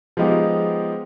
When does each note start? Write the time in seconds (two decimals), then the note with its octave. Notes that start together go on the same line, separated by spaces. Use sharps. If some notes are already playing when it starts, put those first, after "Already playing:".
0.17 F3 G#3 B3 D#4 G4